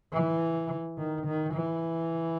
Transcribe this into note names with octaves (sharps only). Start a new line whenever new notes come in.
E3
D#3
D#3
E3